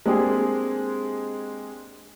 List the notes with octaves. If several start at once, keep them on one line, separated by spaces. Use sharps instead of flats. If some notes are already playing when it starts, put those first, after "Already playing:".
G#3 A#3 C4 D4 G4 G#4